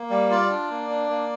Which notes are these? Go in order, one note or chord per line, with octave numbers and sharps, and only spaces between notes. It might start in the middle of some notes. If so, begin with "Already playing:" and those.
Already playing: A#3
G3
F4 D5
D4
A#3
D4
A#3